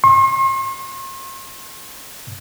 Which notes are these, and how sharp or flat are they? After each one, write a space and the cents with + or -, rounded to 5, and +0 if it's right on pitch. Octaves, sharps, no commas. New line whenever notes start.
C6 +45